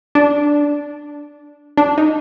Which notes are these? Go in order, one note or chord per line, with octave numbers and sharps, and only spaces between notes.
D4
D4
D#4